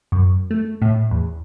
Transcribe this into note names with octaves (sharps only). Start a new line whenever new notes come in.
F#2
A3
A2
E2